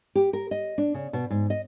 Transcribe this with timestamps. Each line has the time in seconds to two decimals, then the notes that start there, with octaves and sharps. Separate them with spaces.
0.15 G4
0.33 A#4
0.51 D#5
0.78 D4
0.94 C#3
1.13 B2
1.30 G#2
1.50 D#5